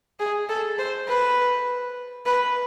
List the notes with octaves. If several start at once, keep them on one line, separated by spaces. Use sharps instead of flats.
G#4
A4
C5
B4
B4